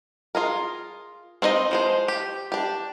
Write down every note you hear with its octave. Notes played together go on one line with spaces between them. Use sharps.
F4 G#4 A#4
C4 D4 D#4 D#5
F3 G#3 C5
G4
D4 G4